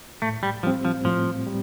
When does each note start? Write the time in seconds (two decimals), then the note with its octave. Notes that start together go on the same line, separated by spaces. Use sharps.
0.22 A2 A3
0.43 G3
0.63 F3 G3 C4
0.85 F3
1.05 A2 F3
1.47 G3